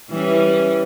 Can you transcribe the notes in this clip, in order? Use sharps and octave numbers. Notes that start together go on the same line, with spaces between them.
E3 G3 C#4